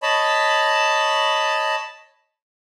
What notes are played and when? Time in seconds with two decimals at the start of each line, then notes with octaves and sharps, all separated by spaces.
0.03 C#5 D#5 A5 B5